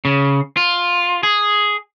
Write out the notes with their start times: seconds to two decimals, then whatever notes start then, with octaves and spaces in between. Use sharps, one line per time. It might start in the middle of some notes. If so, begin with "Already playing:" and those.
0.05 C#3
0.57 F4
1.23 G#4